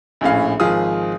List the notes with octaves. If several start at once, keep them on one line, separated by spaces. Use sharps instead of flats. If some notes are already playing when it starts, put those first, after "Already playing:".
A#1 A2 C#4 F5
G#1 F3 F4 G#4 D#6